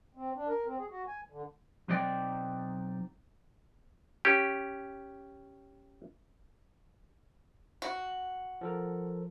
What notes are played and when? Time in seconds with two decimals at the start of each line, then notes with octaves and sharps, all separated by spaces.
0.15 C4
0.35 D4
0.48 A#4
0.65 C4
0.78 G#4
0.90 F#4
1.08 G#5
1.30 D3
1.88 B1 F#3 C4 D#4 D5 G5
4.25 C#4 G4
7.82 F#4
8.61 F3 A4 A#4